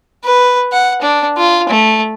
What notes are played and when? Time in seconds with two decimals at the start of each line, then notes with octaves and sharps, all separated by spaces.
0.24 B4
0.73 F#5
1.02 D4
1.37 F4
1.69 A3